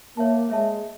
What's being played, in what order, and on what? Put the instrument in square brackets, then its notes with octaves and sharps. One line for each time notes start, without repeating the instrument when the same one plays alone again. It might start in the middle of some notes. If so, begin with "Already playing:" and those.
[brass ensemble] A#3 [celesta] C#5 E5 A5
[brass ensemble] G#3 [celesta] C#5 E5 A5